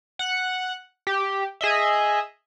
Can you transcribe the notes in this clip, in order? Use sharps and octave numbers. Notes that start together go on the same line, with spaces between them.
F#5 F#6
G4
G#4 D#5 E5